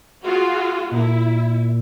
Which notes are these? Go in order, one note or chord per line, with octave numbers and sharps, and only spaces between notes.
F4 F#4 G#4
A#2 E4